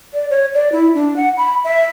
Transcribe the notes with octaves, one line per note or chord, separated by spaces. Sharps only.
D5
C#5
D5
E4
D4
F#5
B5
E5